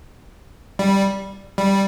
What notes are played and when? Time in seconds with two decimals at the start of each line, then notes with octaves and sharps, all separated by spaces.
0.79 G3
1.58 G3